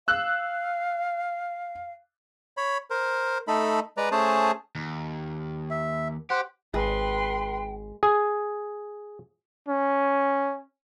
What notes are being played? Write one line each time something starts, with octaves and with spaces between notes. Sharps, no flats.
F5 E6 F#6
C#5 B5
A#4 C5
A3 D#4 A4 B5
G#3 B4 D5 A#5
A3 C#4 G#4 C5 A5
D#2
E5
G4 C5 F#5
G#1 G#3 B4 G5 C6
G#4
C#4